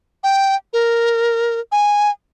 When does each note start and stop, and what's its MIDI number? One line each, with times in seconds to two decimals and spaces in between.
0.24 0.55 79
0.73 1.60 70
1.72 2.10 80